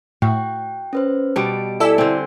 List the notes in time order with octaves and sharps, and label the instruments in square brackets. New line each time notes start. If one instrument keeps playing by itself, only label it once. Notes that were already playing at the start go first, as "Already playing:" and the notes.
[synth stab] A2 [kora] F#4 [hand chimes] G5
[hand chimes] C#4 B4 C5
[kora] B2 G3 [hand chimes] A5 D7
[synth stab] E4 A4 E6 [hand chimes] D5 G#5
[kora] D3 C4 [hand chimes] G#5